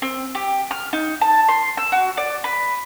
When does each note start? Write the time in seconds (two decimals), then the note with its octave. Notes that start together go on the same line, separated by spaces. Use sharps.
0.02 C4
0.35 G4
0.71 F6
0.93 D#4
1.21 A5
1.48 C6
1.77 E6
1.92 F#4
2.17 D5
2.44 B4